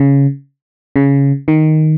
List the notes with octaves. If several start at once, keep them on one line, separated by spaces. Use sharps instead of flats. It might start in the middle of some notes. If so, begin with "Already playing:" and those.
Already playing: C#3
C#3
D#3